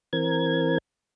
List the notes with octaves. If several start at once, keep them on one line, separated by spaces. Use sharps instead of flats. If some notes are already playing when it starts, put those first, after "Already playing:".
E3 C4 A#4 G#6